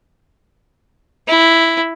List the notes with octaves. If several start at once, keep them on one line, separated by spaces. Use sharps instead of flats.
E4